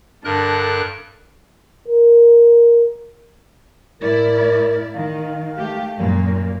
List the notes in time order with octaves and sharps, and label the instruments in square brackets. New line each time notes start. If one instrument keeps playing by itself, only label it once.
[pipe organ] G2 A#4 F#6 [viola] D3 A4
[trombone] A#4
[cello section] A2 E4 D5 [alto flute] A#4
[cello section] D#3 [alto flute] F5
[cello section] A3 G4
F#2 A#2 A#3